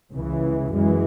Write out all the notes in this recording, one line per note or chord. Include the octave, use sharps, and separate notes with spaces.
C#2 C#3 E3
F#2 E3 G#3